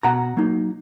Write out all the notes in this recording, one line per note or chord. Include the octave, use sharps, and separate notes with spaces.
B2 F#5 A#5
F#3 A#3 D#4